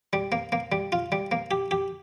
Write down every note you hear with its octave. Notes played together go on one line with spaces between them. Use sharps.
G3
A#3
A#3
G3
F4
G3
A#3
G4
G4